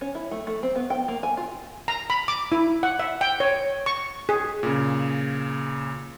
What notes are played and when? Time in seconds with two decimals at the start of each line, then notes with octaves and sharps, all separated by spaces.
0.01 C#4
0.15 E4
0.31 A3
0.47 A3
0.63 C4
0.76 B3
0.90 G5
1.08 A#3
1.23 G#5
1.37 F4
1.88 A#5
2.10 B5
2.28 D6
2.52 E4
2.83 F#5
2.99 E5
3.21 G5
3.40 C#5
3.86 C#6
4.29 G#4
4.63 A#2 C#3